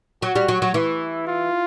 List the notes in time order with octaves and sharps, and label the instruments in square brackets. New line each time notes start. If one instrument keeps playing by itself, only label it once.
[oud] F#3 [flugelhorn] F#4
[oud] G3
F#3
F#3
[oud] E3 [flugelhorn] E4
[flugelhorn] F4